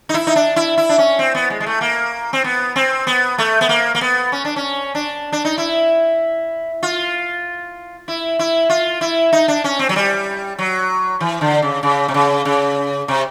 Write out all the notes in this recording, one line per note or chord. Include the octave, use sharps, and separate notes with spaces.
D#4
E4
D#4
D4
E4
E4
D4
C#4
C4
B3
G#3
G#3
A3
A#3
C4
B3
C4
B3
A3
B3
A#3
A#3
B3
C#4
D4
C#4
D4
D4
D#4
E4
F4
E4
E4
F4
E4
D#4
D4
C#4
C4
F#3
G3
F#3
E3
D3
C#3
C#3
C3
C#3
C#3
C3